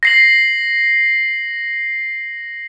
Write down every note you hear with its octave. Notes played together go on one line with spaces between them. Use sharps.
A#6 C7 F#7